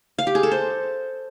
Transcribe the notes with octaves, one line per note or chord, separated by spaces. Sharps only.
F5
G4
G#4
A4
C5